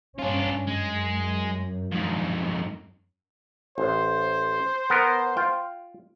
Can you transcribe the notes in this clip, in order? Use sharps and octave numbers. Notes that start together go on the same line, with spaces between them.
G2 C#4 D4 F4
F#2 G#3
F2 G#2
A1 C5
B3 A#4
F4 G5